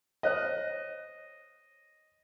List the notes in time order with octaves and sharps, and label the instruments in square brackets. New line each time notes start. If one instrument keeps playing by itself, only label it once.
[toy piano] C5 C#5 F5 [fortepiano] D#5